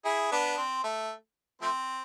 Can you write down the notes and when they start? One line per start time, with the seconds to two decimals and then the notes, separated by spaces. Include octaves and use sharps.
0.05 E4 G#4
0.31 B3 D4
0.57 C4
0.84 A3
1.62 F3 A3 C4